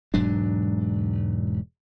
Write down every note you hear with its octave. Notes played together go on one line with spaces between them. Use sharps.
E1 G#2 F#3 D4